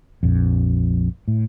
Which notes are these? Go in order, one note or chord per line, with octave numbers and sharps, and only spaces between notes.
A#1 F2
A2